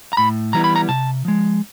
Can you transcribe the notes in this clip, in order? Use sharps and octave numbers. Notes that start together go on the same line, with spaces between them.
A#5
A2 B5
E3 G3 B3 E4 A#5
B5
A#5
C3 A5
F3 G#3